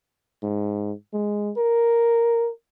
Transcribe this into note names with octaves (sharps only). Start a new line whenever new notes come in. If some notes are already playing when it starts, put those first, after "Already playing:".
G#2
G#3
A#4